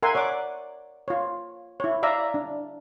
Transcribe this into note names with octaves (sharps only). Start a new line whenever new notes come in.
A#4 E5 F#5 G#5 C6
C#5 D5 F#5 D6
F4 C#5
E4 C#5
D5 E5 F5 A#5
D4